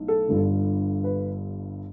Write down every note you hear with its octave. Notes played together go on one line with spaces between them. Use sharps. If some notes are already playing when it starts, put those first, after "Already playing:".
Already playing: B1 A2
A4
G1 G2 D3
B4